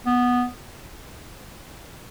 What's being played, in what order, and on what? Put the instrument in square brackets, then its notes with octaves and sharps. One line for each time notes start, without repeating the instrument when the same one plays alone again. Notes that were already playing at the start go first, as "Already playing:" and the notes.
[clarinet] B3